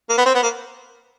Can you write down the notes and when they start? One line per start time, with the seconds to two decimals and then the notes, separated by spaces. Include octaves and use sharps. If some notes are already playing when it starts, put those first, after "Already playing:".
0.09 A#3
0.18 B3
0.26 C4
0.34 B3
0.43 A#3